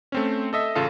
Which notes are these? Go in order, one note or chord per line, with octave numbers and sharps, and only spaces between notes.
A3 C4 C#4
A4 D#5 E5
A1 C#3 F4 A4 F5